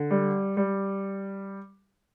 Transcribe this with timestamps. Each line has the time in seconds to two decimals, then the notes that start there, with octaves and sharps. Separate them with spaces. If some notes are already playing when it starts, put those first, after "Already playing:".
Already playing: D3
0.11 G3
0.57 G3